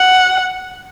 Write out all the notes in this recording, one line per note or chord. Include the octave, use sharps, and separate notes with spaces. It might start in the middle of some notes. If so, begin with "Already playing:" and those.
Already playing: F#5